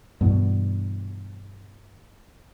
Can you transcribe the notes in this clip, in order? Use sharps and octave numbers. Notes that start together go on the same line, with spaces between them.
G2 B2 E3